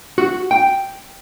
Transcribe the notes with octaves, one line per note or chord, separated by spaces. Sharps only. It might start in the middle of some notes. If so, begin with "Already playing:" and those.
F#4
G5